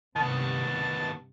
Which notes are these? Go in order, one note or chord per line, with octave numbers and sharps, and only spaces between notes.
G2 C3 D#3 B3 A5